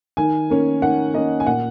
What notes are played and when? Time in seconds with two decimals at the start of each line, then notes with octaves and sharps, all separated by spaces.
0.17 D#3 G#5
0.50 A#3 C#4
0.82 D#3 F#5
1.14 A#3 C#4 D#5
1.40 G#5
1.46 A#2 F#5